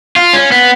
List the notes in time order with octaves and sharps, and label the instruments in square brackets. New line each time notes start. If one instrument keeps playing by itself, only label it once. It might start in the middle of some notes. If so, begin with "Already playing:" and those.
[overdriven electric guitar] F4
C#4
B3